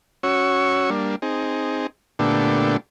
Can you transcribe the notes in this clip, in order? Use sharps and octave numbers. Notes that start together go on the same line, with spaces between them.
C#4 F#4 C#5 C#6 E6
G3 A#3 D4
C4 D#4 G#4
A#2 D3 A3 B3 D4 G4